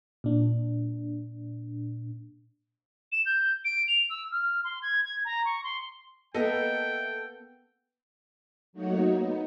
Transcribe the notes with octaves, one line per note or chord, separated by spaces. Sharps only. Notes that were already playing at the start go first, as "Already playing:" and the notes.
A#2 D4
E7
G6
D7
F7
E6
F6
C6
G#6
G#6
A#5
C#6
C6
A#3 B3 A4 D#5 E5 G5 A#5
F#3 A3 A#3 D#4 F#4 C#5
B3 D#4